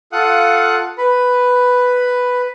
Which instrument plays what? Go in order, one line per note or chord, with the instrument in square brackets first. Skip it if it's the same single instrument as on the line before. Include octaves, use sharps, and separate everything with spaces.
[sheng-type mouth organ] F4 A4 F5 F#5 D#6 F#6
B4 B5